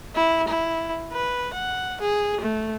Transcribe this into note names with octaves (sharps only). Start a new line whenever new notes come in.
E4
E4
B4
F#5
G#4
A3